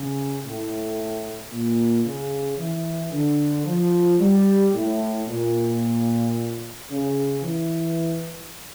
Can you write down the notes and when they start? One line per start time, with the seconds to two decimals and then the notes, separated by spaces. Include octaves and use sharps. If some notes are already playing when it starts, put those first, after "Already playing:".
Already playing: C#3
0.43 A2
1.51 A#2
2.04 C#3
2.58 E3
3.12 D3
3.66 F3
4.19 G3
4.73 A2
5.27 A#2
6.90 C#3
7.43 E3